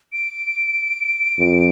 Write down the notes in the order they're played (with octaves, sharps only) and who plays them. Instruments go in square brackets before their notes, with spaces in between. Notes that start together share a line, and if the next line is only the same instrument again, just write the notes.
[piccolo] D7
[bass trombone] F2